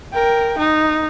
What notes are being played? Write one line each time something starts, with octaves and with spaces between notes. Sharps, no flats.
A#4 G5
D#4